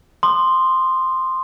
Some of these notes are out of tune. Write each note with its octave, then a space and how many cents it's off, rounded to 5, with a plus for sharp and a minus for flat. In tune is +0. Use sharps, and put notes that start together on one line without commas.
C6 +0 D#6 -35